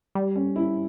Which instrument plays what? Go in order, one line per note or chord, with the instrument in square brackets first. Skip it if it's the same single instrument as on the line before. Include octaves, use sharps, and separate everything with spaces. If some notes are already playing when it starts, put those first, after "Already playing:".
[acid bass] G3
[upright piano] C#4
E4